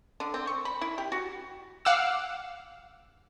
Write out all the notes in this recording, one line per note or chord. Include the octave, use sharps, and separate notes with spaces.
D3
C4
C#6
B5
E4
G4
F#4
F5 F#5 D6 E6